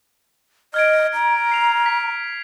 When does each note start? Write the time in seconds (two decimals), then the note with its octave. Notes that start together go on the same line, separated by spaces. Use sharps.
0.74 D#5 F6 G#6 D7
1.14 A#5
1.52 C7 F7
1.86 B6